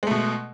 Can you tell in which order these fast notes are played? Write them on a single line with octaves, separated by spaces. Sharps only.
G#3 A3 B2